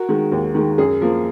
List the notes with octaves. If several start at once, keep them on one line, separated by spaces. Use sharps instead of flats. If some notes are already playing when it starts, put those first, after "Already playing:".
Already playing: F#4 A#4
D#3 G#3
D#2
D#3 G#3
F#2 G#4
F3 A#3